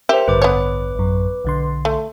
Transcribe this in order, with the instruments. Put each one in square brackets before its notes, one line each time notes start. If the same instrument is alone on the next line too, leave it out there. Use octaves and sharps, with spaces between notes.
[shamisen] G4 E5 [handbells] A#4 C5
[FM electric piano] A1 G2 D3 [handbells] B4 D6
[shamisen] B3 C#5
[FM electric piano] A1 F#2
B1 D3 C6
[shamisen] A3